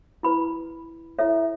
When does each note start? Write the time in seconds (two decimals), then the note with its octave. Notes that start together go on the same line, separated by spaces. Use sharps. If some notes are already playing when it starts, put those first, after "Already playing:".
0.23 E4 B4 B5
1.18 E4 A4 C#5 E5